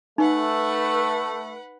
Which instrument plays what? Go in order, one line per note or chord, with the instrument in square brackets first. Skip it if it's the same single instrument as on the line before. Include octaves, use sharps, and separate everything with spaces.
[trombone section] A3 [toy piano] D#4 [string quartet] B4 F#5 B5